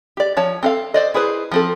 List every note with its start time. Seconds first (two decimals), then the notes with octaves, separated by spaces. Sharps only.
0.17 G4 D5
0.37 F3 C#5 A5
0.63 C4 A4 F5
0.94 C5 D5 D#5
1.14 E4 G#4 B4 C5
1.52 F3 C4 A4